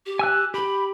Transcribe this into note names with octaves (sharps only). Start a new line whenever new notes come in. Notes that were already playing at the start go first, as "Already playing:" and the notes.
G4
G#5 E6 F#6
G4 B5